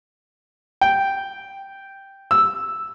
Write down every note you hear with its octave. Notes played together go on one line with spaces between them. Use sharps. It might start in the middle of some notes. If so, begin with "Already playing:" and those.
G5
E6